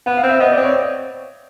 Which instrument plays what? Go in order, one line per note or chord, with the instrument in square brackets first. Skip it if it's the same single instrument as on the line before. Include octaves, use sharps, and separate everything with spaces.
[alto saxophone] B3 [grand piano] F#5
[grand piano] F5
[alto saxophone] C4
[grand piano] E5
[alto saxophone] B3 [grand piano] D#5
[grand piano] D5
[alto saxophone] C4
[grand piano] C#5